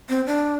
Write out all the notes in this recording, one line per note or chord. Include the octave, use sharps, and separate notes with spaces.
C4
D4